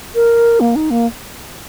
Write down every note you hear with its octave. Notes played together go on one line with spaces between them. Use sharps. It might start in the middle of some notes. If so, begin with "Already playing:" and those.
A#4
A#3
D#4
A#3